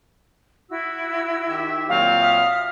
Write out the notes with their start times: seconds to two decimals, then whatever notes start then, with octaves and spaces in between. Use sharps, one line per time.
0.69 E4 F#4 E6
1.48 D#3 G4 E5
1.89 A#2 F#3 C4 F5
2.20 E5 D#6 F6